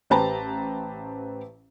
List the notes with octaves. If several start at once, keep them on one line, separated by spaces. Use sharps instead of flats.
A1 G4 B4 C5 A5 A#5